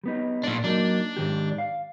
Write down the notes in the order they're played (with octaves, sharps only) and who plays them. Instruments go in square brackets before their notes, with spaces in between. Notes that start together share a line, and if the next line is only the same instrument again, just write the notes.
[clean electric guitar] G3 B3 D#4
[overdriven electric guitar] A#2 D4
[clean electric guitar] F#3 A#3 D#4 [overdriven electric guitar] D4
[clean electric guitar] G#2 D#3 G4
F5